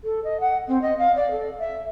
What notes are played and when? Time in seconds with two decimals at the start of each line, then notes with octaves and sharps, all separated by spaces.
0.04 A4
0.24 D#5
0.40 F#5
0.67 C4
0.82 D#5
0.98 F5
1.15 D5
1.31 A4
1.59 E5